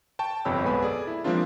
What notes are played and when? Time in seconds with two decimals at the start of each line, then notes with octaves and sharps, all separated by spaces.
0.19 G5 A5 C#6
0.45 G1 F2 C3 C#5 B5 E6
0.64 B1 G#3 B3 B4 G#5 B5
0.82 G#4 A4 D5
1.07 E4
1.24 F3 G#3 A#3 C4 D4 F4